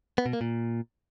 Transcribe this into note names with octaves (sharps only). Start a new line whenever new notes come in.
B3
B2
A#3
A#2